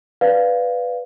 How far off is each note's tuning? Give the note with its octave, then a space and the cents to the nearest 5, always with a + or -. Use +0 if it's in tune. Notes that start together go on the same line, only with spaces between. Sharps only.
B4 +0 D5 +0 F5 +0